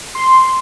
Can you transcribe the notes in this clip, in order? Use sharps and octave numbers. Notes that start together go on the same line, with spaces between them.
C6